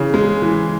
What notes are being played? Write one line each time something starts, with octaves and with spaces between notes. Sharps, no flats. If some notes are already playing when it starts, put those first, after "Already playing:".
Already playing: C#3 E3
G#3
E3